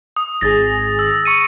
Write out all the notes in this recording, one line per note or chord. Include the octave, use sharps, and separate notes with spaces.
D#6
G#1 G#4 A6 A#6
E6
C#6 C#7 D#7